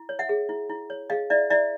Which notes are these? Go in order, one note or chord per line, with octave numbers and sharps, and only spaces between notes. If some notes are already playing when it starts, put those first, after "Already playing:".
Already playing: E4
C#5
E5 F#5
G#4
E4
E4
C#5
G#4 D#5 F5
E4 D5 E5
E4 D5 E5